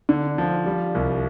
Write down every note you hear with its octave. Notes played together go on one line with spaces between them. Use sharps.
D3
F3
G3
C2